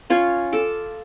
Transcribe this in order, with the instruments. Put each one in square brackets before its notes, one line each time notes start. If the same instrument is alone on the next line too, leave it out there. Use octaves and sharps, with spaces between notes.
[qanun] C#4 F4 C#5
A4 D6